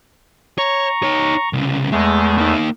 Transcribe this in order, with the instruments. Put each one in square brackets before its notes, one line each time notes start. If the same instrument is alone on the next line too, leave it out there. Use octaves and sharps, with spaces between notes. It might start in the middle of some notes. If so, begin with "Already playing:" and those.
[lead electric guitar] C#5 [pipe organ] A#5 C#6
[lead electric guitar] D#4 C#5
C2 C#3
[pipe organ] E2 A3 [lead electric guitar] G#3
[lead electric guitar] A#3 D#4